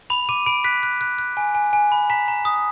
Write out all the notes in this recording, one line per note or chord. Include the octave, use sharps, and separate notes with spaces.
B5 F7
D6 D#7
B5 D7
F#6 B6
F#6
F#6
F#6
G#5
G#5
G#5
B5
A#5 B6
A#5
D#6